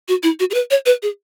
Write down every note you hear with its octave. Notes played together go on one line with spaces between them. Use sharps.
F#4
E4
F#4
G#4
B4
C#5
B4
G#4